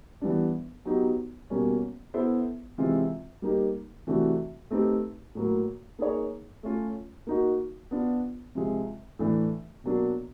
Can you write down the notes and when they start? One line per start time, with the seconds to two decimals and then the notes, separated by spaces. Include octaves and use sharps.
0.21 E3 G3 B3 D4
0.85 F#3 B3 D#4 G4
1.50 B2 G3 A#3 C#4
2.14 B3 E4 A4 C5
2.78 C3 E3 G#3 C4 F4
3.42 G3 A#3 D#4 G4
4.07 C3 E3 A3 D4 F#4
4.71 A3 C4 D#4 G4 B4
5.35 A2 F#3 A#3
5.99 A#3 D#4 G#4 C#5
6.63 A3 C#4 F4
7.27 A#3 D#4 F#4
7.91 B3 D4 F4
8.55 C3 F3 G#3
9.19 A2 E3 A3 D4
9.84 B2 F#3 A#3 D4